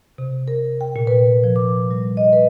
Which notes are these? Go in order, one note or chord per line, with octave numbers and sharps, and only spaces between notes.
C3
A#4
G5
A#2
B4
F3
D6
G3
D#5
B4